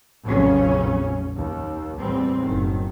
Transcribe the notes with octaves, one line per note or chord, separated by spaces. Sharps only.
F1 A#1 F2 C#3 F#3 C#4
D#2
E2 A2 G3 C4
F#1 D#3